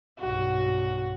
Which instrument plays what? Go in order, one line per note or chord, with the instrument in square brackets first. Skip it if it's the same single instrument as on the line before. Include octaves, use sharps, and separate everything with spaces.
[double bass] B1 G2 [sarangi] F#4